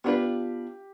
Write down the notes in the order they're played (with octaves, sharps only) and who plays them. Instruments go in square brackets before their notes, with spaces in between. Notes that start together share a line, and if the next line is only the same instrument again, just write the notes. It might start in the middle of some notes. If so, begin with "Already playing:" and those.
[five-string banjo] B3 D4 F4 B4 [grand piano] G4